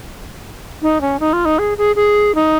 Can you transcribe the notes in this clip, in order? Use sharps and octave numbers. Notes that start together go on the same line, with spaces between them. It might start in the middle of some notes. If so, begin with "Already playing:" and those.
D#4
C#4
D#4
F4
D#4
G#4
G#4
G#4
D#4